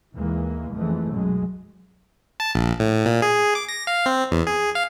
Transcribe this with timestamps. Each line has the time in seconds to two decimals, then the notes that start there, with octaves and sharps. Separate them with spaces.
0.16 D#2 E3 G#3 A#3
0.73 F#1 F2 E3 G#3 A3
1.09 B1 F#2 F#3 G#3
2.40 A5
2.55 A#1
2.80 A2
3.06 A#2
3.22 G#4
3.55 D6
3.69 A#6
3.87 F5
4.06 C4
4.31 E2
4.47 G#4
4.75 F5